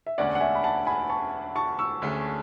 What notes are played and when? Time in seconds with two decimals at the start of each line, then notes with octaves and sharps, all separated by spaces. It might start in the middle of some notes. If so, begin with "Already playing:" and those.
0.07 E5
0.18 E1 D2 D3 A3 C#4 D5 F#5
0.35 F#5
0.41 E5 G#5
0.55 B5
0.64 F#5 A5
0.87 G#5 B5
1.09 A5 C#6
1.56 A5 C#6
1.79 C#6 E6
2.02 D2 D3 A3 C#4 G#4